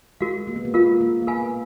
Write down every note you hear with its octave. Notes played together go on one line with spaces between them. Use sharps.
G#3 F#4 A#4 F5
A#3
B3
A#3
G#3 F4 A#4 F5
A#3
A#3
B3 A#4 F5 G#5 B5